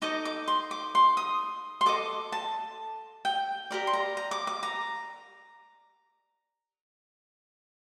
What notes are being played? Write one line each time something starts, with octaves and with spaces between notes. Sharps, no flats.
D#4 A4 D#5 D6
D6
C6
D6
C6
D#6
C6
A4 D#5 D6
A5
G5
G4 A#4 D5
C6
A#5
A#5
D6
D6
A#5